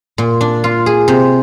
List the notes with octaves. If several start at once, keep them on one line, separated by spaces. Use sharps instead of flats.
A#2
D4
F4
G#4
C3